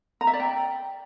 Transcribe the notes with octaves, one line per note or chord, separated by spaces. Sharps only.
A#5
E5
D5
G5